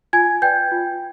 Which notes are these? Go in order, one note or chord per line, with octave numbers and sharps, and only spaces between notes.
F4 G#5 G#6
B4 D5 G5 G6
F4